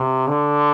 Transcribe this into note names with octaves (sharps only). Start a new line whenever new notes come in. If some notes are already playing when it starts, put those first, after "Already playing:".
Already playing: C3
D3